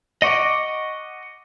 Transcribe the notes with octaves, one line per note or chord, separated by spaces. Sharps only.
D#5 F#5 C#6 D6